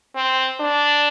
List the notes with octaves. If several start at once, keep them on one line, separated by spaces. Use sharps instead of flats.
C4
D4